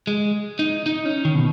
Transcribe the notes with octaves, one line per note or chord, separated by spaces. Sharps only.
G#3
D#4
D#4
C#4
D#3
B2